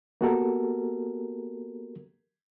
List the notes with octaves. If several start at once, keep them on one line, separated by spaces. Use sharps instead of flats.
A#3 B3 F#4 G4 A4 A#4